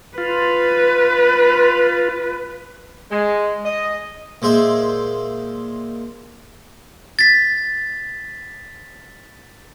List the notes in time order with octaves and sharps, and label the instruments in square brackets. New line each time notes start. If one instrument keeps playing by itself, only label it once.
[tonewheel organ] F4 [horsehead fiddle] B4
[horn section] G#3
D#5
[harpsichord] A#2 G#3 C5 E5
[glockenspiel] A6 B6